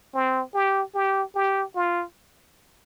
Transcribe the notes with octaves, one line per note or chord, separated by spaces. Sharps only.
C4
G4
G4
G4
F4